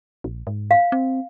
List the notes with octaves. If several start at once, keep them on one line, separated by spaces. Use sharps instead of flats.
A#1
G#2
F5
C4